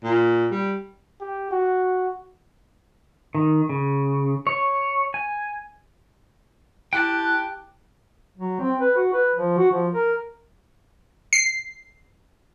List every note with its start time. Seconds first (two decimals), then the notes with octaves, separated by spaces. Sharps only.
0.04 A#2
0.51 G3
1.21 G4
1.51 F#4
3.35 D#3
3.69 C#3
4.47 C#5
5.14 G#5
6.93 E4 G4 G5 A5 F#6
8.38 F#3
8.60 C4
8.81 B4
8.96 F#4
9.13 B4
9.35 F3
9.58 F#4
9.71 F3
9.93 A#4
11.33 C7